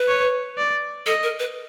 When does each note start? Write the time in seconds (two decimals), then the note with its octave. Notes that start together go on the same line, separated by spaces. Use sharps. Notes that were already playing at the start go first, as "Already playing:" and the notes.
Already playing: B4
0.08 C#5
0.58 D5
1.06 A4 D#5
1.23 A#4
1.39 B4